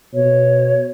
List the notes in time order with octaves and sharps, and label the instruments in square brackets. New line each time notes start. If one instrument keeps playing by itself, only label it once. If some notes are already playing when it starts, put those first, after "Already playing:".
[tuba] B2 [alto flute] C#5